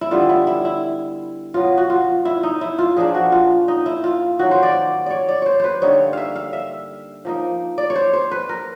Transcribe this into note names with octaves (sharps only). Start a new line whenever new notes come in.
E4
D3 G3 B3 F4
E4
E4
E4
B2 F#3 B3 F4
F#4
F4
E4
D#4
E4
F4
A#2 F3 A#3 D4 G#4
F#4
F4
D#4
E4
F4
D#3 F#3 A#3 F#4
C5
D5
C#5 D5
D5
C5 C#5
B4 C5
D3 G3 A#3 D#4 C#5
E5 F5
F5
E5
F3 A#3 D#4
D5
C#5
C5
C5
B4
A#4